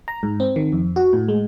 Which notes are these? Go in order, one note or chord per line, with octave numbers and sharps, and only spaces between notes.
A#5
G#2
C4
D#3
F2
F#4
A2
G#3